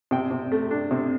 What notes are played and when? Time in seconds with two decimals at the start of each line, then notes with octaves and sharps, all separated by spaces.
0.11 C3 G5
0.31 C3
0.52 A3
0.71 D4
0.91 C3